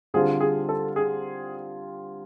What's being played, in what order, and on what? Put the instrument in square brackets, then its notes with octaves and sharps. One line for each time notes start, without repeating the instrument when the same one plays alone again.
[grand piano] D3 G3 C4 F4 [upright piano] G#4
[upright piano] G#4
A4
G#4